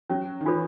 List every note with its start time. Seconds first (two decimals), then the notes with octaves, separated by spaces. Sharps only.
0.10 F#3 C#4
0.41 D#3
0.45 E3 F4 A4 C#5